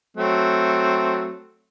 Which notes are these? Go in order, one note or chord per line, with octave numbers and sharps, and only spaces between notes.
F#3 A3 C4